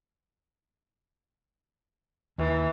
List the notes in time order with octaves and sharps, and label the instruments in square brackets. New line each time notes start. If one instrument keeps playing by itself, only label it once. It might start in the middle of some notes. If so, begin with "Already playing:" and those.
[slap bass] D#2 [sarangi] E3